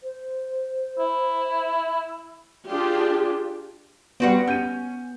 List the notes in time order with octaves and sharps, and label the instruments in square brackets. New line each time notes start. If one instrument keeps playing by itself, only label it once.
[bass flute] C5
[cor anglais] E4
[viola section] D4 F4 G4 G#4
[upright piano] G3 B4 [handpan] B3 [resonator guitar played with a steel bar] C4 F#4 F#5
[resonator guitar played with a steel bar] C#4 [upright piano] G6 D#7